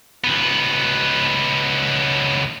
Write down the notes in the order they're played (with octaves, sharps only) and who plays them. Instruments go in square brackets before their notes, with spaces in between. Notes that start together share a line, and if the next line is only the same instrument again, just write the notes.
[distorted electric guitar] C#2 B3